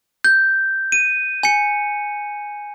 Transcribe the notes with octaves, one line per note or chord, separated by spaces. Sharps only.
G6
D#7
G#5 C#7